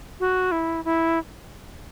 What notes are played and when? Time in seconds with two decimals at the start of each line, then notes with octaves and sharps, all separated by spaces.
0.20 F#4
0.52 E4
0.85 E4